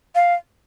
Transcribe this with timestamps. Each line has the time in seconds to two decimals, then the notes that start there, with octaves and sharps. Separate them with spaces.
0.15 F5